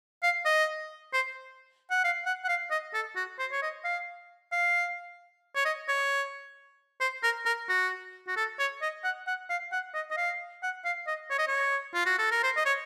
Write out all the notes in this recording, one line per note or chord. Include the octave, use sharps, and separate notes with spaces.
F5
D#5
C5
F#5
F5
F#5
F#5
F5
D#5
A4
F#4
C5
C#5
D#5
F5
F5
C#5
D#5
C#5
C5
A#4
A#4
F#4
F#4
A4
C#5
D#5
F#5
F#5
F5
F#5
D#5
D#5
F5
F#5
F5
D#5
C#5
D#5
C#5
F4
F#4
A4
A#4
C5
D#5
C#5